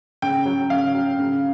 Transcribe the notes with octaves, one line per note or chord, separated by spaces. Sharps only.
C#3 G5
F#3
C#3 F5
F#3
C#3